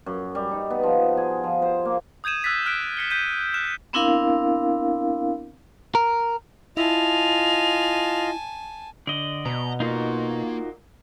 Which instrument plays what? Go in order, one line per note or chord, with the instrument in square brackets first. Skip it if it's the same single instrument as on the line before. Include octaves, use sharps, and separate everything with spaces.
[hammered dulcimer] F#2
G3
D#4
B3
F3
G#4
F3
C5
A#3
[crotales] D#6 G6 G#6 D#7 E7
E6 F#6 A6 B6
F6 F#6 B6 D7
B6 C#7 G7
G6 B6 D#7
F6 F#6 E7
[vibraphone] B3 C4 D4 E4 A#4 F5
[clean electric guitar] A#4
[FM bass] E4 [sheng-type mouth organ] F4 D#5 [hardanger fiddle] G#5 A5 [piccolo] F7
[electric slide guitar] D3 [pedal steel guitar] D5 D#5
[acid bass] B2 [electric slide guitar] B3 [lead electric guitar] A#5
[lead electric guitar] A#3 [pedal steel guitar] D#4 F#4 [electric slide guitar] F4 A#4